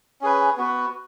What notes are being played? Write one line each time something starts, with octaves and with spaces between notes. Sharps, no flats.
C#4 G#4 B4
B3 F#4 B4